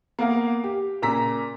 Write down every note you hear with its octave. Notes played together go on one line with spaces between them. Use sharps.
A#3 B3 A#4 F5
G4
A#2 C#3 A#5 E6 B6